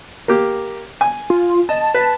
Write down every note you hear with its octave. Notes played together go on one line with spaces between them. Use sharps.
A#3 G4
G#5
F4
D#5 A5
B4